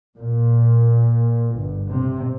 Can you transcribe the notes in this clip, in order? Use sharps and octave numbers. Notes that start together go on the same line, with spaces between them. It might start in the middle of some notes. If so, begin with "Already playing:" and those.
A#2
G1
C3